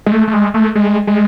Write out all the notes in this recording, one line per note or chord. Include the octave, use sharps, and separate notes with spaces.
G#3
A3
A3
G#3
A3
G#3
G#3